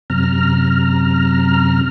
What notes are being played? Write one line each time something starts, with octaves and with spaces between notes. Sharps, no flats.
F#2 C3 A#5 F6